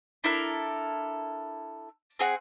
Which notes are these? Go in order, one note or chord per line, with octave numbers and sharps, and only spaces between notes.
D4 E4 A4 A#4
C4 G#4 F#5